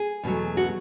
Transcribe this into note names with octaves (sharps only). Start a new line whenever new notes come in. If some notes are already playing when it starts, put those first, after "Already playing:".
Already playing: G#4
E2 B2 F#3 A3
F#4